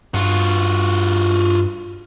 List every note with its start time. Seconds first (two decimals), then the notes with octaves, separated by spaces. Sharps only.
0.14 G2 F4 F#4